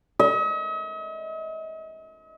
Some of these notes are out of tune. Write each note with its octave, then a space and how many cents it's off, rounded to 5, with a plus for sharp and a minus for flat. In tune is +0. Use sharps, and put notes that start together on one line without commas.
D#5 +45